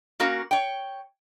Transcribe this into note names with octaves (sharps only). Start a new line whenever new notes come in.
A#3 C#4 F#4 A#4 F5
C#5 G5